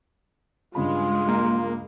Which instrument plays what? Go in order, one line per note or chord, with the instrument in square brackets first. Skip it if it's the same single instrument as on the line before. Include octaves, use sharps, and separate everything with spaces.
[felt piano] G2 C#3 B5 [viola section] G#3 [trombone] F4
[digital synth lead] A#3